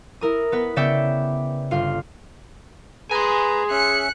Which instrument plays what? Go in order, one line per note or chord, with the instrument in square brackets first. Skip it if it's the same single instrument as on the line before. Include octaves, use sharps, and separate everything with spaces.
[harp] E4 A#4 D#6
B3 B4
C#3 B3 D5 E5 G5 C#7
G1 F4 F5
[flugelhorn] G#4 [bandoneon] B4 A#5 [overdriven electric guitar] G#5 C6
[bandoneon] C#4 E5 [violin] F#6 C#7